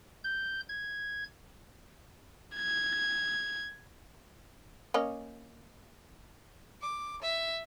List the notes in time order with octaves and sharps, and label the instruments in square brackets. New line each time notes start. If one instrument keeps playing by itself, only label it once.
[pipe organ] G6
G#6
[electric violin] G#6
[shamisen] A#3 C#4 D#5
[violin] D6
E5